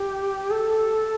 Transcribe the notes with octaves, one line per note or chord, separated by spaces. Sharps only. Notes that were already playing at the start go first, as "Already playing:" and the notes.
Already playing: G4
A4